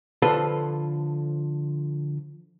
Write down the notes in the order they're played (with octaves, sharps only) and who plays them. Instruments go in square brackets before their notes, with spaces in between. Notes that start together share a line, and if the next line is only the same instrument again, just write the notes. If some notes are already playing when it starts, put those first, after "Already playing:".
[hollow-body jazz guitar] D3 F3 A4 B4